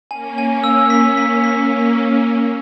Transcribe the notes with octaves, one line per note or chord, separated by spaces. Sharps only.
A#3 C#4 G#5
G#5
E6
B6
B6
B6